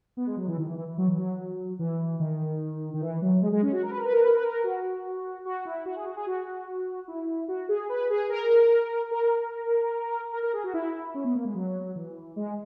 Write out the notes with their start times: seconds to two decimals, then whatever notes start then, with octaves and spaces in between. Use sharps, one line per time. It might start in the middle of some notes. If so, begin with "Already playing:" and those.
0.17 B3
0.27 G#3
0.37 F#3
0.48 E3
0.57 D#3
0.67 E3
0.78 E3
0.88 E3
0.98 F#3
1.08 E3
1.18 F#3
1.79 E3
2.20 D#3
2.94 D#3
3.01 E3
3.22 F#3
3.42 G#3
3.52 G#3
3.62 C#4
3.72 F#4
3.83 A#4
3.90 B4
3.97 A#4
4.05 B4
4.13 A#4
4.20 B4
4.28 A#4
4.36 B4
4.43 A#4
4.64 F#4
5.45 F#4
5.65 E4
5.86 F#4
5.96 G#4
6.06 F#4
6.16 G#4
6.26 F#4
7.08 E4
7.48 F#4
7.69 G#4
7.89 B4
8.10 G#4
8.30 A#4
9.11 A#4
10.33 A#4
10.43 A#4
10.53 G#4
10.64 F#4
10.74 E4
11.14 C#4
11.24 B3
11.35 A#3
11.45 G#3
11.55 F#3
11.96 E3
12.36 G#3